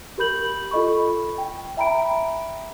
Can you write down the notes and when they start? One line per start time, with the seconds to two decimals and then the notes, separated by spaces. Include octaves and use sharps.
0.18 G4 A#4 B5 G6 F#7
0.71 F4 A4 D#5 B5 C#6
1.38 G5
1.77 E5 G5 A#5 B5 D7